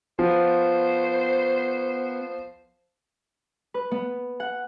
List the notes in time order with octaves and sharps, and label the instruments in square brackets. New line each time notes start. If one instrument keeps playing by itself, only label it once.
[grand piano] F3 [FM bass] B3 [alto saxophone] C5
[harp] B4
B3
F#5